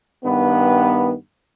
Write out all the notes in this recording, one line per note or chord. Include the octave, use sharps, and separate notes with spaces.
G2 D#3 B3